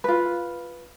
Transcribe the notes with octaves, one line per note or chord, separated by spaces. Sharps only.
F4 B4